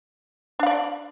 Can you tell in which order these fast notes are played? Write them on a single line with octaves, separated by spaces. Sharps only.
D4 F5 D5